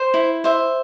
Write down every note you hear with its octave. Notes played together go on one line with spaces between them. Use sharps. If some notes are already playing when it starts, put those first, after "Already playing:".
Already playing: C5
E4
C5 E5